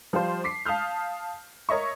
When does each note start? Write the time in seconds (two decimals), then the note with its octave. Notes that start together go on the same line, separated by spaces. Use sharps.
0.13 F3 G3 F4 C5
0.44 D6 B6 C7
0.65 F5 A5 D#6 F6 G6
1.69 A#4 C#5 D#5 E5 C#6